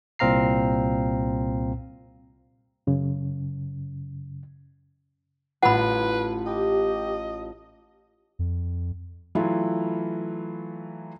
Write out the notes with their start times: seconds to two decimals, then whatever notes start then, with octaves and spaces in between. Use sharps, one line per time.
0.19 C2 A#2 C4 F5 A#5 C7
2.87 F#2 C#3
5.63 A1 F4 B4 F#5 B5
6.46 G4 D#5
8.39 F2
9.35 E3 F#3 A3 E4 F4